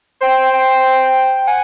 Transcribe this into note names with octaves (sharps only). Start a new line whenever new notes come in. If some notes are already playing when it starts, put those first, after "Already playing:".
C5 G5
G5
F#5 G#5